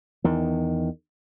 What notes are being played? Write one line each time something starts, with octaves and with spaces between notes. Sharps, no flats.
E2 D#3